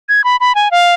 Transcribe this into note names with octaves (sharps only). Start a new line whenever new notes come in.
G#6
B5
B5
G#5
F5